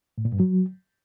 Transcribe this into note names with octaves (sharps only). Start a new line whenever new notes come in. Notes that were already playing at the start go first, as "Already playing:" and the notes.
A2
A#2
G2
F#3